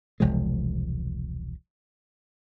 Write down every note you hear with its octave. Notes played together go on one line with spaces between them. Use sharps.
E1 C2 F3 G#3